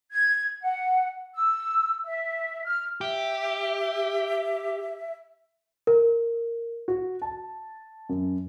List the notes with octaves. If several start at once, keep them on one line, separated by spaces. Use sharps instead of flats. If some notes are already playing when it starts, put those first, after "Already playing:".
G#6
F#5
E6
E5
F6
G4 E5
A#4
F#4
A5
F#2